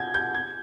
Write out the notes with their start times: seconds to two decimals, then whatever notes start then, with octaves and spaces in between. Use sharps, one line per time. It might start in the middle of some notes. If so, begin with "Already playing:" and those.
Already playing: G6 G#6
0.14 G6
0.35 G#6